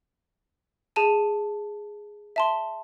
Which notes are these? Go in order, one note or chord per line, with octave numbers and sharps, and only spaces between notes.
G#4 A5 D#7
E5 A5 C6